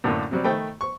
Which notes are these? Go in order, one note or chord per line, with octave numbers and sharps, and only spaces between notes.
F#2 A2 D3 A#3
C3 F#3 G3
D#3 A3 G5 B5
C#6